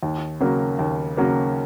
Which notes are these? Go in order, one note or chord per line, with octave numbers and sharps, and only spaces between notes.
D#2
C#3 F#3 A#3
D#2
C#3 F#3 A#3